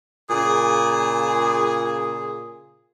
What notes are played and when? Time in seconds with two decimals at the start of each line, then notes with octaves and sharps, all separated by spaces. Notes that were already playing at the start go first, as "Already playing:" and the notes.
0.30 A#2 C#3 G#4